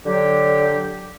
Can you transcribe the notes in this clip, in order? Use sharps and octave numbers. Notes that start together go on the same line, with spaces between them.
D3 F#3 G4